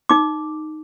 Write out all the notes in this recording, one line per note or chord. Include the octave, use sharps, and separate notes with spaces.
D#4 D6